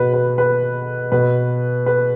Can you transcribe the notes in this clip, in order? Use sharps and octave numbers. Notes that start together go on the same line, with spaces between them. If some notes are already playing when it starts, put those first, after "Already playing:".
Already playing: B2 F#4 B4
B4
B4
B2 B4
B4